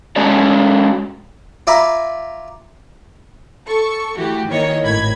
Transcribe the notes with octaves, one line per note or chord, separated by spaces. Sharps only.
G#3 C#4 F#4 A4 C#5 D5
F4 D5 E5 G#5 A#5 B5
A4 C#6
E3 A3 F#4 G4
D#3 E3 A#3 C#5 D#5
G#1 A2 B5 G#6